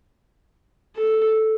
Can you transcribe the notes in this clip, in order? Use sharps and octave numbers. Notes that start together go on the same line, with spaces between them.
A4